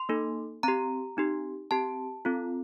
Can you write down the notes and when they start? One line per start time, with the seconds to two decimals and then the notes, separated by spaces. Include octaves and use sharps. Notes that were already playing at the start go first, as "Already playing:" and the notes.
Already playing: C6
0.09 A#3 D#4 A4
0.63 C4 G4 A#5
1.17 C4 D#4 G4
1.71 C4 G4 A5
2.25 C4 F4 A4